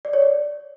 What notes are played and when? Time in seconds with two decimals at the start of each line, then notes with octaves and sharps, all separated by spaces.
0.05 D5
0.13 C#5
0.22 D5